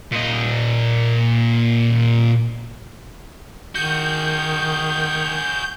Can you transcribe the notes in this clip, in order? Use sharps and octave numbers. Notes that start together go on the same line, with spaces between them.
A#2 D#5
D#3 F#4 G#4 G6